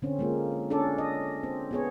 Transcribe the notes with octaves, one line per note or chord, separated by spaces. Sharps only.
D3 C4 C#4
G#3 A#3 F4
C#4 D4 A4 D5
D#5
C4
B3 G#4 C#5